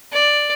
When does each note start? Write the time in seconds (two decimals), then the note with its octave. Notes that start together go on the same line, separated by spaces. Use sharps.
0.13 D5